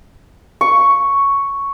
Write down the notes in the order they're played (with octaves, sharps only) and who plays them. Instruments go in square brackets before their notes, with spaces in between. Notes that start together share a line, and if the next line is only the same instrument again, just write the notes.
[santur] C#6